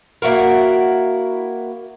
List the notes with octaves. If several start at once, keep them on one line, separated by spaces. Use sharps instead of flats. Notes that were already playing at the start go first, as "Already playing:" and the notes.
A#3 E4 F#4 A#4